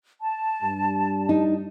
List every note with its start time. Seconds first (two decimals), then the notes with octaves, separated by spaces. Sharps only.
0.22 A5
0.62 G2 G3
1.29 D#4